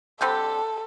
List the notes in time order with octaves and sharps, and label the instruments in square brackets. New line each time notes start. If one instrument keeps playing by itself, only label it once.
[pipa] D3 G3 C4 G4 [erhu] A4